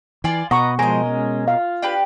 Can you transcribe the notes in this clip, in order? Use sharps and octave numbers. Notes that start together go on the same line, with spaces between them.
E3 F4 D5 G#5
B2 B4 D#5 F#5 A#5 C#6
F3 G#3 A#4 C5 D#5 G#5
G#3 C#4
F4 F5
D4 G4 B4